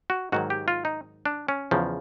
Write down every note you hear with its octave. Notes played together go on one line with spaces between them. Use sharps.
F#4
G#2 D#3 F#3 F#4
G4
F4
D#4
D4
C#4
E2 C#3 F3